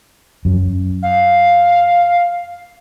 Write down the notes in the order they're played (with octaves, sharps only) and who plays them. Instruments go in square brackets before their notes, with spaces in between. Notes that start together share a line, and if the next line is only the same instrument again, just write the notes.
[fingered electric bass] F#2
[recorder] F5